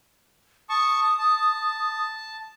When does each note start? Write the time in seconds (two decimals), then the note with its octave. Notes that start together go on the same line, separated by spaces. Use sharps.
0.69 A5 C#6 D#6
1.19 A5